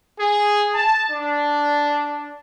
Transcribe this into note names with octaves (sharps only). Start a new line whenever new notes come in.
G#4
A5
D4